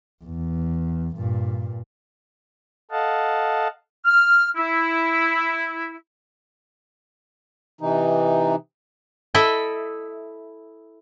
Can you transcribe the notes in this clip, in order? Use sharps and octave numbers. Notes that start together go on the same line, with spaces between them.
E2
G2 A#2
A4 D#5 F5 F#5 A5
F6
E4
C3 E3 D#4
E4 A4 D#5 E5